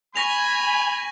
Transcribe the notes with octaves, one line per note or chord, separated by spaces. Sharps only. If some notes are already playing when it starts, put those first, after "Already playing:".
G#5 B5 C#6 A#6 F7